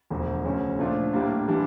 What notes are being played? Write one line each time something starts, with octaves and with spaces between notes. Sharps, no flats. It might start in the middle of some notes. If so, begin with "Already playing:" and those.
E1 D2 D3 F3
D2 C#3 F3 C#4
A#2 F3 A3 D4 F4
A2 G3 A#3 D4 F4
E3 G3 D4